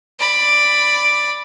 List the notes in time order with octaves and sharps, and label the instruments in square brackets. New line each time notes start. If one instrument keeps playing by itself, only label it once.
[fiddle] D5 B5